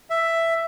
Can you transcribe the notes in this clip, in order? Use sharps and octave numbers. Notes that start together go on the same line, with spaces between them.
E5